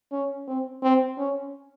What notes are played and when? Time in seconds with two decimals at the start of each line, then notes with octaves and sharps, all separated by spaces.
0.12 C#4
0.47 C4
0.83 C4
1.18 C#4